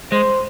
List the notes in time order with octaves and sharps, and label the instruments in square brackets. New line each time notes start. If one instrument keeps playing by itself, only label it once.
[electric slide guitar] G#3 [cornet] C5